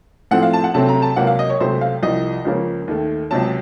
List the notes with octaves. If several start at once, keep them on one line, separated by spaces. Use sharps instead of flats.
A2 F3 A3 C4 F#5
F5
A5
F#5
C3 F#3 A3 C4 A5
A#5
A5
C#2 C3 F#3 A#3 F#5
F5
D#5
C#5
C#2 C3 F#3 A3 C5
F5
C2 C3 F3 D#5
C#2 C#3 F3 A#3 C#4
D#2 D#3 A3
C#2 C3 F#3 A5